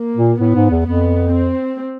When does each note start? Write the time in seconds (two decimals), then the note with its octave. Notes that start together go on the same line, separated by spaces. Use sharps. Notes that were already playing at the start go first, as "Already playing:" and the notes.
Already playing: A#3
0.17 A#2
0.40 A2 B3
0.55 G#2
0.71 E2
0.86 F2 B3
1.32 C4